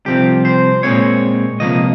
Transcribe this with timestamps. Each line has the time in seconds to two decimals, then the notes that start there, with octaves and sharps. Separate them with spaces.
0.06 C2 C3 F3 C4 G4
0.45 C5
0.83 A#2 G#3 C4 C#5
1.60 C#2 C3 F3 A#3 D#5